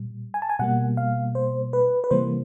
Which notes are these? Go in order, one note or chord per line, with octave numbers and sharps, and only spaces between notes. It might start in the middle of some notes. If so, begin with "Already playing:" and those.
Already playing: A#2 G3
G#5
A5
G#5
B2 G3 A#3 F#5
F5
C5
B4
B4
C3 E3 G3 A#3 C5